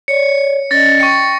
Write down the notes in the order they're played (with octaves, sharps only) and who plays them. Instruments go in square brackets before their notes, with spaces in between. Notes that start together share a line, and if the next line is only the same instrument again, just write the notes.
[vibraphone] C#5 D5 [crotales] C#7
[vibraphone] C#4 D5 D#5 [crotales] A6 A#6
[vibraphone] G5 [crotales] C#6 C#7